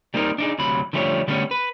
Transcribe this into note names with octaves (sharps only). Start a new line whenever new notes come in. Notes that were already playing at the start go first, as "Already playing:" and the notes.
G3 A#3 C4 D#4 A#4
D4 D#4 G#4
D2 C3 F#3 B5
D3 F3 G3 A3 C#4 C#5
D3 G3 A3 B3 C#4
B4